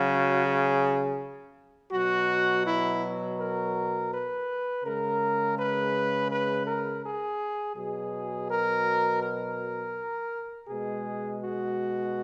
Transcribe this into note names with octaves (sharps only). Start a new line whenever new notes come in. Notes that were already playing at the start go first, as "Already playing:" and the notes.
Already playing: C#3 F#3 F#4
G#4
B2 F#3 F#4
E4
A#4
B4
C#3 G#3 A#4
B4
B4
A#4
G#4
B2 F#3 G#4
A#4
A#4
B2 G#3 G#4
F#4